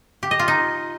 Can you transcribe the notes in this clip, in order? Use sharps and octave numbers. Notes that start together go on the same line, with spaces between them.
G4
D#5
F4
D#4